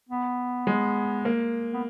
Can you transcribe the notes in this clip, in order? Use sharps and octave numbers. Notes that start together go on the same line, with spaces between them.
B3
G#3
A#3
B3